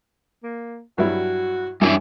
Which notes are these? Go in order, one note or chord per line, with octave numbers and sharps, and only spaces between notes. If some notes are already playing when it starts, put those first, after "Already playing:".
A#3
G2 F#3 E4 F#4
F#2 G3 D4 E4 E5